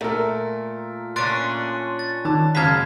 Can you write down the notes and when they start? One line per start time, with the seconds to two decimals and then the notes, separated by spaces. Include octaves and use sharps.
0.01 A#2 A3 A4 A#4
1.16 A#2 C#4 D4 C6 F#6 A6 D7
1.99 A6
2.25 D#3 A5
2.55 F#1 G#3 A#3 A5 F6 G#6 B6